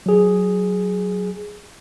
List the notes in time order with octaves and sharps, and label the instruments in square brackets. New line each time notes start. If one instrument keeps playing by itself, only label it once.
[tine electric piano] F#3 G#4